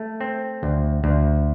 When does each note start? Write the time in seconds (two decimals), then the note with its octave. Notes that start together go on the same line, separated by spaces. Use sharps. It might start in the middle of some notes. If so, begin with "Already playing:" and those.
Already playing: A3
0.21 C4
0.63 D2
1.04 D2